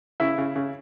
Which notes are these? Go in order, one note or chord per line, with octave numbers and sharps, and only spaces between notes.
C#3 E4
C#3
C#3